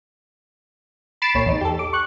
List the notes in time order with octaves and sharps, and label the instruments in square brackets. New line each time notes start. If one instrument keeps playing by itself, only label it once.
[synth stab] B5 A6 C7 D7 E7
C2 A#2 C#5
E2 D#4
G4 A4
D6
C#6 F#6